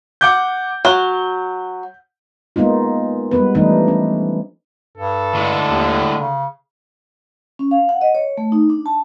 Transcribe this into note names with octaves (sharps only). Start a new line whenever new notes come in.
F#5 D6 G6
F#3 G7
G#3 A#3 B3 D#4 F4
G3 G#3 B3 B4
E3 F3 G3 A3 D4 D#4
C#4
G2 A4
A2 D3 G#3
D#2
C#3
C#4
F5
F#5
D#5
C#5
A3
D#4
D4
A5